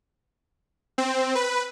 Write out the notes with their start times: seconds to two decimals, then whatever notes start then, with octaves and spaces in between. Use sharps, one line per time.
0.98 C4
1.35 B4